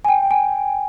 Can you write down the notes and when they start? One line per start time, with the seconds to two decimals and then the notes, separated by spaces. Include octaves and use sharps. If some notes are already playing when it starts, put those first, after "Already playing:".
0.05 G#5
0.08 G5
0.31 G#5